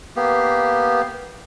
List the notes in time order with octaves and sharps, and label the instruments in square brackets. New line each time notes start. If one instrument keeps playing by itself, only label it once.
[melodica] A#3 B3 G4